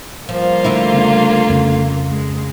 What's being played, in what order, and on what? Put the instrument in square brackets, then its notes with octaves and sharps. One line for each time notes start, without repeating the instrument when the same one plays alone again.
[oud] F3 [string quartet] G3 A#3 F4
[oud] D3 A3 E4
[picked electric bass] C#3 B3 D4
F2 C#3
[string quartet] G#3